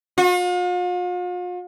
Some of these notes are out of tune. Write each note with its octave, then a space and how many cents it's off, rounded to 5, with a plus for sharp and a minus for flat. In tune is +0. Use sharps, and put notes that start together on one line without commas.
F4 +45